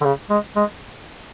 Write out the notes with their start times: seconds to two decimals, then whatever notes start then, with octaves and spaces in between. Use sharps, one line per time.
0.01 D3
0.05 C#3
0.30 G#3
0.56 G#3